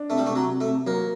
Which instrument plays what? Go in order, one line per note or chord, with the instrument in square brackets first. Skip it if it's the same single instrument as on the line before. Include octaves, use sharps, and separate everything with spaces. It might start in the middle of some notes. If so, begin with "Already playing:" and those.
Already playing: [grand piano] D4
[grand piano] C3 [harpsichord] A3
[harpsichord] G3
A3
[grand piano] C3
[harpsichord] F#3
[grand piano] C3
[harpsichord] A3
[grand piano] C3
[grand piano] F#3 [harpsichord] A#3